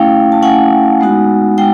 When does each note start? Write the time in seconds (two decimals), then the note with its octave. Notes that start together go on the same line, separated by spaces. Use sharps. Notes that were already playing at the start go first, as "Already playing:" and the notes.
Already playing: A3 C#4 E4 F5 G5
0.32 A5
0.42 A3 C#4 E4 F#5 G#5
1.01 G#3 B3 D#4 F#4
1.58 G#3 G5